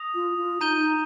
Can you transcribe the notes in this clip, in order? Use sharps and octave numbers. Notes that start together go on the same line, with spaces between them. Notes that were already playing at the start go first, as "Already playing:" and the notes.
Already playing: D#6 A#6 F7
F4
F4
D#4 A#5 G6 D#7 G7